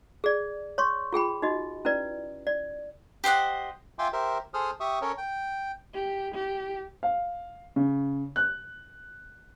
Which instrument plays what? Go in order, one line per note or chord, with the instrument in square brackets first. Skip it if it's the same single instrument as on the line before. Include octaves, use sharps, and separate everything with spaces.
[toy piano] G#4 D5
C#5 C6 C#6
F4 G#4 G5 B5
D#4 F#4 D#5
C#4 E4 B4 D5
D5
[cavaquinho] G4 C5 D#5 F#5
[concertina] F4 E5 G5 G#5 C6 D6
G4 A#4 C5 E5
G#4 A4 C5 D#6 F6
G4 E5 C#6 D#6
C#4 A4 A#4 C#5
G5
[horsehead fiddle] G4
G4
[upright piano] F5
C#3
F#6